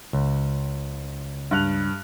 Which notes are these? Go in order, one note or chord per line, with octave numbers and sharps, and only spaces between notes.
C#2
G2 F#6 F7